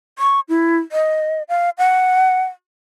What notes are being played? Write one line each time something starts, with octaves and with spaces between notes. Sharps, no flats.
C#6
E4
D#5
F5
F#5